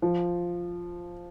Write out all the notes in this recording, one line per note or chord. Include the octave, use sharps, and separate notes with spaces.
F3